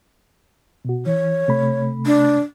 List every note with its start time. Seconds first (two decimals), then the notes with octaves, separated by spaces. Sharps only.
0.85 B2 F#4
1.06 E3 C#5
1.48 C3 A3 B5
2.06 D4